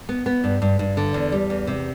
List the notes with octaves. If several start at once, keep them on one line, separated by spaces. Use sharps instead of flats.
B3
B3
G2
G2
G2
D3
E2
G3
E2
C3